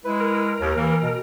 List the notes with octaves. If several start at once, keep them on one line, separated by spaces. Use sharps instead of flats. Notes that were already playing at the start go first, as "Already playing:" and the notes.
G#3 E4 B4
A#4
D#2
E3 A#3
B2